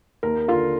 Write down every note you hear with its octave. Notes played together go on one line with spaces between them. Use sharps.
D#2 A#4
D3 F4 F5